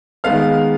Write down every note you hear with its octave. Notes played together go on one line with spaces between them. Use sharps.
D#3 G#3 B3 F5 F6